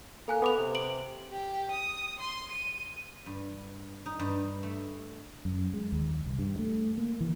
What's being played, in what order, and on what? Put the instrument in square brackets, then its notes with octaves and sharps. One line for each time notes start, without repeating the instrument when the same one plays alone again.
[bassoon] A#3 [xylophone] A4 G#5 F#6
[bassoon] B3 [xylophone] A4 D6 F7
[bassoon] C3
[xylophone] D7 F#7
[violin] G4
D#6
C6
D#7
[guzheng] G2
D#4
G2
A3
[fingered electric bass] F#2
G#3
D#2
C2
G2
A3
A#3
E3